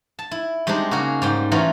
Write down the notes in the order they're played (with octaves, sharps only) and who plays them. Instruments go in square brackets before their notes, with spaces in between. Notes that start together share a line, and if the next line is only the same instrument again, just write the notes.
[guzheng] A5
E4
G3 G#3 C4 D4 D#4
C#3 A#3 C#4 F#4 G#4
G#2 G3 G5
E3 F#3 A3 C#4 D#4 F4